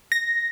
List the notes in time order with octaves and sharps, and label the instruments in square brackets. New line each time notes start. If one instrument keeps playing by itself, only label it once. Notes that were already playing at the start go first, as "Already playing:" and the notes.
[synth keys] A#6